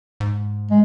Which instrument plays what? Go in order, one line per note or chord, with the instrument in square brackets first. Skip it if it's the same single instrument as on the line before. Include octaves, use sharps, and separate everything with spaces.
[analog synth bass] G#2
[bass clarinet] G#3